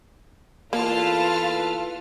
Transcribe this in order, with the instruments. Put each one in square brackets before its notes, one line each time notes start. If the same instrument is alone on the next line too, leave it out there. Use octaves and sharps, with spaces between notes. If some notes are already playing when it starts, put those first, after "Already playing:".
[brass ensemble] E2 A4 B4 [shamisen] A#3 [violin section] F4 [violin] A5 F6